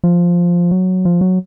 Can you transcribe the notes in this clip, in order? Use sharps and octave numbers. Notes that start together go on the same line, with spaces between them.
F3
F#3
F3
F#3